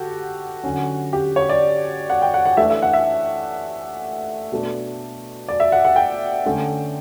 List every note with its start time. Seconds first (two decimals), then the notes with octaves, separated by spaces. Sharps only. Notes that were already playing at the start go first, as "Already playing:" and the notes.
Already playing: D3 F#4 G4 A4
0.64 D3 F#3 C#4
1.13 G4
1.36 C#5
1.49 D5
2.10 F#5
2.22 G5
2.34 F#5
2.46 F#5
2.57 E3 A3 D4 E5
2.70 E5
2.82 F#5
2.93 E5
4.52 B2 A3 D4
5.48 D5
5.60 E5
5.72 F#5
5.85 F#5
5.96 G5
6.46 D3 A3 C#4